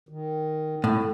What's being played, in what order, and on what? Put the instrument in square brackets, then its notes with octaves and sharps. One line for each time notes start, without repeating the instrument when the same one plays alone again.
[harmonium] D#3
[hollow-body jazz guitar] A2